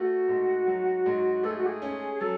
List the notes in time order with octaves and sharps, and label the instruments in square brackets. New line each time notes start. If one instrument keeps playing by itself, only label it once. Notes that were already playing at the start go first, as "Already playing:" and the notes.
Already playing: [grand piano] A3 [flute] F#4
[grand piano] G#2
F#3
G#2
[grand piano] A3 [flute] A4
[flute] G#4
F#4
G#4
[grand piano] C#4
[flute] G#4
[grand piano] F#3 [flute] A4